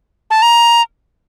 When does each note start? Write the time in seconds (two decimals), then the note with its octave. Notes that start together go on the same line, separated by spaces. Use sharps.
0.31 A5
0.42 A#5